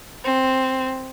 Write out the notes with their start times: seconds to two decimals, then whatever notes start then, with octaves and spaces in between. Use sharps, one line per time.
0.24 C4